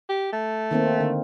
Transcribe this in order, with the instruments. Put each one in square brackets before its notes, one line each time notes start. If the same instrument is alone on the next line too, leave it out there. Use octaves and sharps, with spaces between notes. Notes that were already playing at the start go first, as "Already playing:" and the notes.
[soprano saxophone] G4
A3
[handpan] D#3 A#3 C4
D3